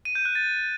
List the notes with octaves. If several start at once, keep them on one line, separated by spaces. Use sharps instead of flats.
D#7
G6
F#6
A6